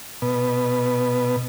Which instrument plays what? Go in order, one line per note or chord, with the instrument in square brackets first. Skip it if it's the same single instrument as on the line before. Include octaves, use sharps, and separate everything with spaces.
[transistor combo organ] B2